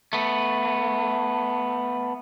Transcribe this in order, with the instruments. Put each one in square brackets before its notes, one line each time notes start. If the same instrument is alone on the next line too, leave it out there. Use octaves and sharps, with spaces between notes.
[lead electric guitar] A3 B3